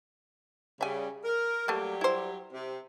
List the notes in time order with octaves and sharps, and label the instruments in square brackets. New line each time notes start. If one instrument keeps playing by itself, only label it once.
[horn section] C#3 G3 [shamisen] E5 G#5
[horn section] A#4
[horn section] F#3 G3 G4 [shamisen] A3 A#3
[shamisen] E4 C5
[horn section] C3